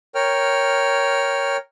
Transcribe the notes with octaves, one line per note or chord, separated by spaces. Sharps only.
A#4 C#5 G5 F6